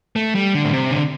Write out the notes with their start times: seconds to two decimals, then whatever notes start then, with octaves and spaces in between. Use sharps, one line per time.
0.16 A3
0.35 G3
0.54 D3
0.65 A2
0.73 C3
0.91 D3